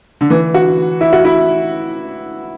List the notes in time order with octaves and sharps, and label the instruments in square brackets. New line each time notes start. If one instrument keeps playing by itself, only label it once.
[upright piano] D3
E3
F#4
E4
F#4
E4